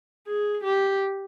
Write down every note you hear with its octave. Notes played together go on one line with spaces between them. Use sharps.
G#4
G4